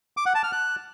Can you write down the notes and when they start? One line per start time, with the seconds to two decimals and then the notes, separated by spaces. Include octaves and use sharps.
0.17 D6
0.26 F#5
0.35 A5
0.43 F6
0.52 F#6